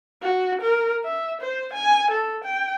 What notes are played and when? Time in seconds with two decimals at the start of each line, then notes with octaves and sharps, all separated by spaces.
0.22 F#4
0.61 A#4
1.04 E5
1.41 C5
1.73 G#5
2.11 A4
2.44 G5